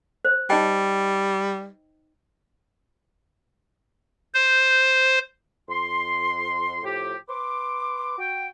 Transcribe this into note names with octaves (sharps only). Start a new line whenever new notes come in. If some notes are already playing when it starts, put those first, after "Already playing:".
C5
G3 D#4 D#5 G5
C5
F2 C6
A2 F3 G4
B4 C6 D6
F#4 G5